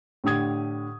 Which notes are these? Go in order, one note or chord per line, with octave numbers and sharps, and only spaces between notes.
A2 D3 G4 D#6 G#6